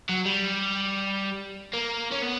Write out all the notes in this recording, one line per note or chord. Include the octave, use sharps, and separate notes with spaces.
F#3
G3
A#3
C#4
B3